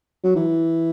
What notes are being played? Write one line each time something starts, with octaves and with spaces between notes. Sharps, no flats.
F#3
E3